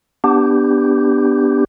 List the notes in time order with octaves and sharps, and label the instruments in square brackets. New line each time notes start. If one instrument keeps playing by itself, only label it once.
[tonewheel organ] B3 D4 G4